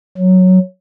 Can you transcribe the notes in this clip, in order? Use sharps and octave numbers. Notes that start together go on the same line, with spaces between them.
F#3